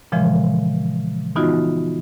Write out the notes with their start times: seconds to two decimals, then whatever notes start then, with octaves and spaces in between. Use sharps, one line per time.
0.12 A#2 C#3 E3 F3 G#3
1.36 E3 B3 D#4 F4 F#4 D#5